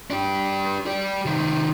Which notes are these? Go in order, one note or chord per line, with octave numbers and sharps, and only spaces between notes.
D4 G4
G4 D5
C3 D#3